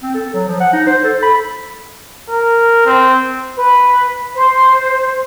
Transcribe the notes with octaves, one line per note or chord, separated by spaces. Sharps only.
C4
A4
F#3
F3
F#5
D#4
C5
A4
B5
A#4
C4
B4
C5